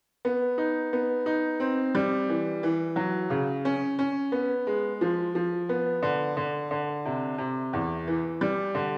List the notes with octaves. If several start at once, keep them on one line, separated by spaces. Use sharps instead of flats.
B3
D#4
B3
D#4
C4
G3
E3
E3
F#3
C#3
C#4
C#4
B3
G#3
F3
F3
B3
D3
D3
D3
C3
C3
E2
E3
G3
D3